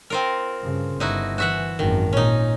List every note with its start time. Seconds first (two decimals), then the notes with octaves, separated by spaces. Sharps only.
0.10 C4 F4 A#4
0.62 G2 C#3
1.00 G1 D#4 E4 F#4
1.38 E3 F#4 E5 F#5
1.79 G#1 F#2 D#3
2.13 A#2 C#4 D#4